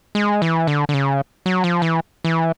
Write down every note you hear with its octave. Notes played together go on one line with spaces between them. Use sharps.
G#3
E3
D3
D3
C#3
F#3
F3
E3
E3